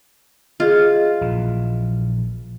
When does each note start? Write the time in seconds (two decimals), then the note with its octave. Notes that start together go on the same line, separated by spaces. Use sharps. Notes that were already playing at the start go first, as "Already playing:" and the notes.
0.60 F4 G#4 D#5
1.21 A#1 E3